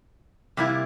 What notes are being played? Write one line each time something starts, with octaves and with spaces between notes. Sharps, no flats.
C3 G3 A#3 E4